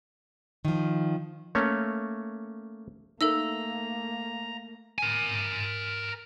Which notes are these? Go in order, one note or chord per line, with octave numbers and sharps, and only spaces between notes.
D#3 F3
A3 A#3 C#4 C#5
A3 A#3 D#4 A4 A#4 E5 A#5 E6
A#4 G#5